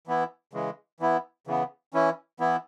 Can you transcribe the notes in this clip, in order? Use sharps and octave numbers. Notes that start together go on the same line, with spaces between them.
E3 B3 E4
C#3 E3 G#3
E3 B3 E4
C#3 E3 B3
E3 C#4 E4
E3 B3 E4